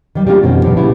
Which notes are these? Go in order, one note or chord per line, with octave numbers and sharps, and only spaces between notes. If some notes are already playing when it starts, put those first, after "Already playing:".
D#3 G3
G3 A3 A#3 D4 F4 G4
F2 B2 D#3 C4 C#4
B2 D3 F3 G3
A#2 C#3 G3 B3 E4